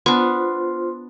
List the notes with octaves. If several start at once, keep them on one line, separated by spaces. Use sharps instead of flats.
B3 D4 F4 C5 C6